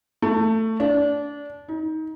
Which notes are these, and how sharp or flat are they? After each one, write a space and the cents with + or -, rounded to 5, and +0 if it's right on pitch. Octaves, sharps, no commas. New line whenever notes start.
A3 +15
D4 -20
D#4 +25